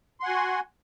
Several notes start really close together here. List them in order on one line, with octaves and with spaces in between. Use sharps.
C6 F#5 G#5 F#4